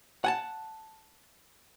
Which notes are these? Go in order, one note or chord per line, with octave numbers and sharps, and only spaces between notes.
F#5 G#5 A5